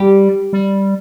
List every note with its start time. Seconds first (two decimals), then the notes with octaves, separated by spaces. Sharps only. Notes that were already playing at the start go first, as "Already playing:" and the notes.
Already playing: G3 G4
0.53 G3